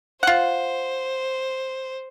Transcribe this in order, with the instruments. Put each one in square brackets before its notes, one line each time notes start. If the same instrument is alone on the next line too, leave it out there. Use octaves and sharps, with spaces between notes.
[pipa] F4 F#5 [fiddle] C5